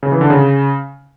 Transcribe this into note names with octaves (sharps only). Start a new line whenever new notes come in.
C#3
E3
D3
C#3